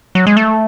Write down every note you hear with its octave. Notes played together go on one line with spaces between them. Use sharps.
F#3
G#3
A3